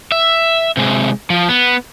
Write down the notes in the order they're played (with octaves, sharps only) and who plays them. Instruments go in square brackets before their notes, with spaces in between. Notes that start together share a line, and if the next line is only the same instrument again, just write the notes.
[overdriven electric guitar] E5
C3 G#3
F3
B3